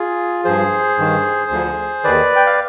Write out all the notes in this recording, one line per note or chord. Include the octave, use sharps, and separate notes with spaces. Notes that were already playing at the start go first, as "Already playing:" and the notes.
Already playing: F4 G#4
G2 F3 G#4 C5
G2 D#3
D2 D3 F3
D#2 D#3 B4 D5
G5
F5